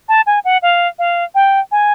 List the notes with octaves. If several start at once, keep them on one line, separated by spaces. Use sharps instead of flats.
A5
G#5
F#5
F5
F5
G5
G#5